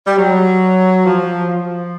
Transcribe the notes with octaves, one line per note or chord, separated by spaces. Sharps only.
G3
F#3
F3
F3